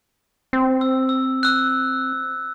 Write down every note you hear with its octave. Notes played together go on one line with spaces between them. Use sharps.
C4
E6
E6
E6 F#6